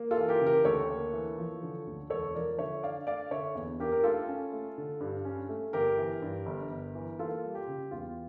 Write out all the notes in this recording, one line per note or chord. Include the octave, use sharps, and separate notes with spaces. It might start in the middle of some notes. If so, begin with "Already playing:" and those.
Already playing: A#3
F4 A4
E3
G4 A#4
C#3
G4 A#4
D2 A4 C#5
A#3
E3
F3
D3
D2
E1 A4 C#5
F3 A#4 D5
D3 C#5 E5
D4 D5 F5
A3 D5 F5
D3 C#5 E5
E2
D4 G4 A#4
A#4
A3 F4 A4
C#4
A3
D3
G2
C#4
A3
G1 G4 A#4
E3
G2
G1
G1
E3
A#3 F4 A4
G3
G4
C#3
E2 F4